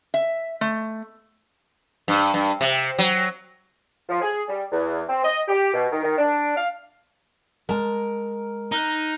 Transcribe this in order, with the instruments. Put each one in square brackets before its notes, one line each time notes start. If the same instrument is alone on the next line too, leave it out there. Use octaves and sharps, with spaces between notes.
[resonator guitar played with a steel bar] E5
A3
[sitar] G2
G2
C3
F#3
[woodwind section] F3
G#4
G3
E2
C4
D#5
G4
B2
D#3
D#3
D4
F5
[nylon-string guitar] G#3 A5 [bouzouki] A#4
[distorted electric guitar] D#4 [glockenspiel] A#5 F6 F#6